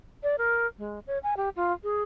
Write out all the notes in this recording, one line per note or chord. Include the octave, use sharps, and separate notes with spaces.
D5
A#4
G#3
C#5
G#5
G4
F4
G#4